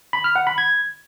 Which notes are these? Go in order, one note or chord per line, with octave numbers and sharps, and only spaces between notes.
B5
F6
F#5
B5
G#6